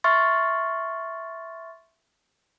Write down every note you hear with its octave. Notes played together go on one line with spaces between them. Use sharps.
E5 C6 C#6 F6 A6